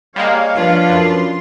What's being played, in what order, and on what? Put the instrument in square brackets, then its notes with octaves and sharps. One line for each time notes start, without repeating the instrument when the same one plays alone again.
[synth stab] G3 G#3 A#3 [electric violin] C#5 F5
[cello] F3 F4 [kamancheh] D4 B4
[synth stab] F#2 [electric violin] C6